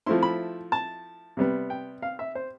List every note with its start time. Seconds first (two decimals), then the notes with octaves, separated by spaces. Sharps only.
0.06 F3 A3 C4 E4 C6
0.23 B5
0.72 A5
1.37 C3 G3 B3
1.70 G5
2.02 F5
2.19 E5
2.35 C5